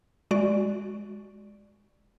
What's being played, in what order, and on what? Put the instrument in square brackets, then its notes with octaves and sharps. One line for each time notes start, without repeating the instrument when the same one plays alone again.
[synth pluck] G#3 F#4 D5